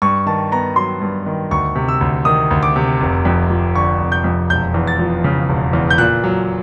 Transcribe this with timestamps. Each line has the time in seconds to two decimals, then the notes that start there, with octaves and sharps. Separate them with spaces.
0.02 G2 C#6
0.26 D#3 A5
0.51 B3 A#5
0.76 F#3 C6
1.01 G2
1.26 D#3
1.51 D2 C#6
1.75 C3
1.88 E6
2.01 D2
2.25 D#3 D#6
2.51 D2
2.63 D6
2.76 C3
3.00 F1
3.25 F2
3.50 F3
3.75 D3 C#6
4.00 F1
4.12 G6
4.24 F2
4.50 E1 G6
4.74 E2
4.87 A6
4.99 F3
5.24 C#3
5.49 E1
5.73 E2
5.90 G6
5.98 A#2 F#6
6.24 F#3